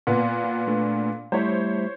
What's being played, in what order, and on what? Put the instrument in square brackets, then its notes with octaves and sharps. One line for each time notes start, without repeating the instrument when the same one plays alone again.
[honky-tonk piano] A#2 B3
[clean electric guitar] F4
A3 D4
[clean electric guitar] G3 A3 E4 [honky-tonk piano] C5 C#5